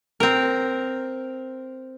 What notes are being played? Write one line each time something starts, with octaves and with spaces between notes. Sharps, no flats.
C4 A#4